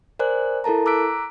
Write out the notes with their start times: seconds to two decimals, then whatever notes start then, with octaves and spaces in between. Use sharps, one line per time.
0.19 A#4 C5 D5 G#5 F#6
0.64 E4 A4 A#4 A5 A#5
0.86 A#5 D6 E6 F#6 B6 D7